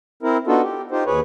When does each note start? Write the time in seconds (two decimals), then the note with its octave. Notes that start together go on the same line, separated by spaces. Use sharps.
0.23 C4 E4 A#4
0.47 B3 D4 D#4 F4 F#4 A4
0.63 G4
0.91 D#4 F4 G4 C5
1.06 D#2 G#4 B4 C#5